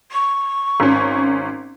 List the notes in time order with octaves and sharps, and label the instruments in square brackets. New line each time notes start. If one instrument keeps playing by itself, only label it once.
[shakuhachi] C#6
[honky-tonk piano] G#1 C#4